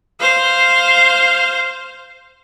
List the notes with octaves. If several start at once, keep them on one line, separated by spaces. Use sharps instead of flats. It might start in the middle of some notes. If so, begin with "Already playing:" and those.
C5 F5